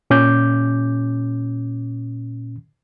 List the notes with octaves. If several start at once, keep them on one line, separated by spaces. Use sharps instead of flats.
A#2 C#4 D6 G6